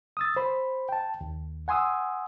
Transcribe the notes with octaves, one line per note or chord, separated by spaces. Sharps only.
D#6 E6 A6
C5 B5
G5 A5
D#2
F#5 G#5 C6 D#6 E6